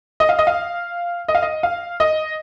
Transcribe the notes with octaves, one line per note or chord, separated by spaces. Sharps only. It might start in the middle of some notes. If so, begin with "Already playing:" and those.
D#5
F5
D#5
F5
D#5
F5
D#5
F5
D#5